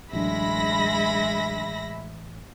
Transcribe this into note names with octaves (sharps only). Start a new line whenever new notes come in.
A1 D2 F#3 G#3 D4 E5 B5 A#6